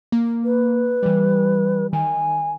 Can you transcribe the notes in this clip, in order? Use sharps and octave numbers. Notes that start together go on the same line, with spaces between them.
A#3
B4
E3 G3
D#3 G#5